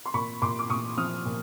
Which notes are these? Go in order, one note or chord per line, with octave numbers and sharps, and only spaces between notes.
C6
A#2 B5 C#6
A#2 C6 D6
D6
A#2 C#6 D#6
F3 D#6 F6
A#2